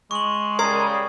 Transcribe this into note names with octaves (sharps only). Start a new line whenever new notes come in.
G#3 C#6 F#7
C#3 G3 A#4 D#6 G#6 C7